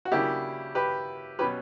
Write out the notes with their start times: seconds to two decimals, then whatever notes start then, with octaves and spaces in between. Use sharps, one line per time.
0.05 F#4
0.12 C#3 F#3 A#3 D4 E4 G4
0.75 G4 B4
1.39 B2 F#3 C#4 G4 B4